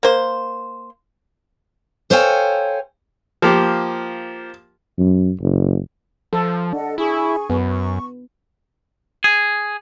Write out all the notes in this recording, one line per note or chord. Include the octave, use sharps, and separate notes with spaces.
A#3 C5
A4 C5 C#5 F5 G5 G#5
F3 A#3 G4
F#2
F#1
F3 A4
D4 A4 D#5 F#5
E4 G#4 G#5 C#6
F#2 B3
C#6
G#4